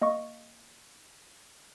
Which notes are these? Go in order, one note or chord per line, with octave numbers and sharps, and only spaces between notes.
A#3 D#5 F5 C#6